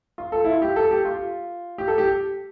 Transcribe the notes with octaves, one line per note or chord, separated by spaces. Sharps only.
F4
A4
E4
F4
G4
A4
G4
F4
G4
A4
G4